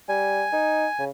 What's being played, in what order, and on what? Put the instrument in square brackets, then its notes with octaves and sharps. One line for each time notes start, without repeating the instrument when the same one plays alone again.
[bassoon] G3 [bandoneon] G#5
[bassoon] D#4
C#3